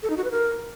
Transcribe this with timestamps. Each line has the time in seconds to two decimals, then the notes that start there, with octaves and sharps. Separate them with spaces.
0.03 A4
0.10 D#4
0.17 F#4
0.24 B4
0.31 A#4